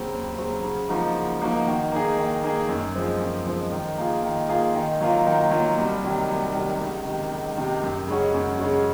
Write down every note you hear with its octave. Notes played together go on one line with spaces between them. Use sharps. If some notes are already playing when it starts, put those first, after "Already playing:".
Already playing: D#2 C#3 F#3 C4
D#2
C#3 F#3 C4
C#3
F3 A#3 D#4 F#4
C#3
F3 A#3 D#4 F#4
D#3
A#3 D#4 G#4
D#3
A#3 D#4 G#4
F#2
F3 G#3 C4
F#2
F3 G#3 C4
D#3
A#3 F4 G#4
D#3
A#3 F4 G#4
D#3
F#3 A#3 F4
D#3
F#3 A#3 F4
C2
C3 D#3 F#3
C2
C3 D#3 F#3
C#2
C3 D#3
C#2
C3 D#3
F#2
C#3 G#3 C#4 F#4
F#2
C#3 G#3 C#4 F#4